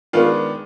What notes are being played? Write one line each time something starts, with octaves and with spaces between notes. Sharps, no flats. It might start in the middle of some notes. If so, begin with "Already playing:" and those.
D#3 G#3 B3 D4 F4